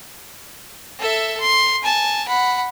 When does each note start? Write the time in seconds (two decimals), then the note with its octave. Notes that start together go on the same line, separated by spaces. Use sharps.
0.99 A4 E5
1.40 C6
1.83 G#5 A5
2.28 F#5 B5